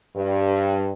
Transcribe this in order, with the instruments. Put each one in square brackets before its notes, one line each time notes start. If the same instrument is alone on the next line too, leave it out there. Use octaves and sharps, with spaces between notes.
[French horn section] G2